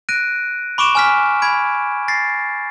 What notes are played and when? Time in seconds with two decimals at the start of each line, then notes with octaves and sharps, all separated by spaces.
0.09 F#6 A#6 D7 D#7
0.78 B5 C#6 D6 D7 E7
0.95 G#5 F6 B6
1.42 B5 G#6 D7
2.08 A6 A#6 C7